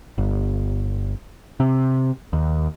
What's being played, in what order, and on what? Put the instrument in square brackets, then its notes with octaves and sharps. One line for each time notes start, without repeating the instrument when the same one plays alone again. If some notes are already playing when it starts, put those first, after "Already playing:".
[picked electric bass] G1
C3
D#2